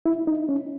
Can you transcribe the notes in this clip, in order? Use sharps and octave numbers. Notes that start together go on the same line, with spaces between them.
E4
D#4
C#4